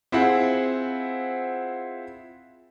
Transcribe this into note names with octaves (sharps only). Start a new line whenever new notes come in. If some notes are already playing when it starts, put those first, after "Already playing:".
C4 E4 F4 G#4 C5 F#5